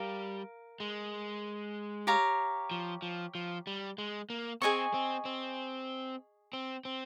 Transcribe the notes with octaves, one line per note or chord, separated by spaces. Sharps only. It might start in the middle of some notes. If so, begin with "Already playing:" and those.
Already playing: G3 A#4 F5
G#3
G4 C#5 F5 A#5
F3
F3
F3
G3
G#3
A#3
C4 G#4 D#5 G#5 C#6
C4
C4
C4
C4